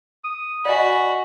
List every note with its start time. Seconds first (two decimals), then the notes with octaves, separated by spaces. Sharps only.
0.24 D#6
0.65 F#4 D5 D#5 G#5 B5